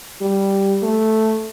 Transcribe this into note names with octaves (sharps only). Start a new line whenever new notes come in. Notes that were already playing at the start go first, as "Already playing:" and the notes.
G3
A3